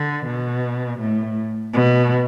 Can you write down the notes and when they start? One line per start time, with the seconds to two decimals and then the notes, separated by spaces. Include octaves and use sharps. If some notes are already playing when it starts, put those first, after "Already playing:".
Already playing: D3
0.26 B2
1.00 A2
1.74 B2